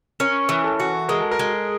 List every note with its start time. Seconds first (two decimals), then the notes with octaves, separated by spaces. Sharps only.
0.20 C#4 A#4
0.49 E3
0.64 A4
0.80 F#4
1.08 G#3 A#4
1.20 A4
1.31 A#4
1.39 G#3